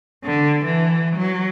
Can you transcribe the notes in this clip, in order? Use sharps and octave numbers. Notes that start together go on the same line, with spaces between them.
D3
E3
F#3